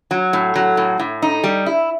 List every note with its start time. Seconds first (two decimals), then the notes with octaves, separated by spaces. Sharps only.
0.11 F#3
0.33 A2
0.55 F#3
0.77 A2
0.99 A2
1.22 D#4
1.44 G3
1.66 E4